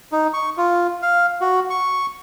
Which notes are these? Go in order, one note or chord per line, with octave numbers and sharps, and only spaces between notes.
D#4
C#6
F4
F5
F#4
C#6